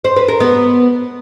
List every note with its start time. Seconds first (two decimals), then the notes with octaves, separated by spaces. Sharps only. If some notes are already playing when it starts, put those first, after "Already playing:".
0.04 C5
0.16 B4
0.28 A#4
0.40 B3